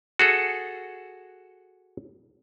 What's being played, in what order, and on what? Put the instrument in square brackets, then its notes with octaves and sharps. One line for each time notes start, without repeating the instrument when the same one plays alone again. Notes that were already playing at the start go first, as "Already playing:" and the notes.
[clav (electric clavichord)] F#4 G#4 A4